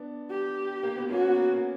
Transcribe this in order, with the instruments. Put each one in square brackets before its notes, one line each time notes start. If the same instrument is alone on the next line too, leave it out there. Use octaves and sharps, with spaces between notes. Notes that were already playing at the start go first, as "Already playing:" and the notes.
Already playing: [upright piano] B3 D4
[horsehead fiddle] G4
[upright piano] A#3
B3
[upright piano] A#3 C#4 [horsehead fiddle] F#4
[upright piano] B3
A#3
A#3